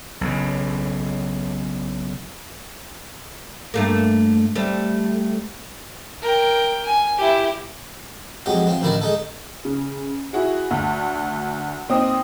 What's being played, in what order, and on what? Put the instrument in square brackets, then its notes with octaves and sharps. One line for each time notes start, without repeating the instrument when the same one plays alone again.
[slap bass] B1 C#3
[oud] G2 A3 A#3
G3 A3 C4
[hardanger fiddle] A#4 G5
G#5
E4 G4
[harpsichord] F2 F#3 G#3 G4
F3 C4
A1 D2 D#3 E4 A#4 D5
G#3 D#4 A4
[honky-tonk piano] C#3
E4 F#4 G#4
D2
A#2 C4 D#4 D#6